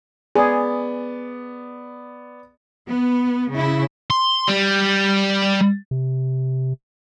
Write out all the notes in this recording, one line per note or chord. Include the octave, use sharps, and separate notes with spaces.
B3 G#4 D5
B3
C#3 E4
C6
G3
C3